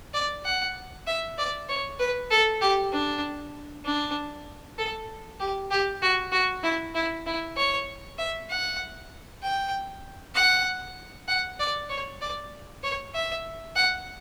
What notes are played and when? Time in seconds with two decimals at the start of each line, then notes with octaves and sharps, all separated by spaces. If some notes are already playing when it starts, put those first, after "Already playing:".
0.14 D5
0.45 F#5
1.07 E5
1.38 D5
1.69 C#5
1.99 B4
2.31 A4
2.61 G4
2.92 D4
3.85 D4
4.78 A4
5.40 G4
5.71 G4
6.02 F#4
6.32 F#4
6.63 E4
6.95 E4
7.26 E4
7.56 C#5
8.18 E5
8.50 F#5
9.42 G5
10.35 F#5
11.28 F#5
11.59 D5
11.89 C#5
12.21 D5
12.83 C#5
13.14 E5
13.76 F#5